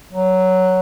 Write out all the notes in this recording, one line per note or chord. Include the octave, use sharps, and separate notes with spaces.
F#3